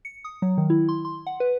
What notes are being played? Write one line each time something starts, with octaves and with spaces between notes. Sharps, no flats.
C#7
D#6
F#3
D#3
E4
C6
C6
F#5
B4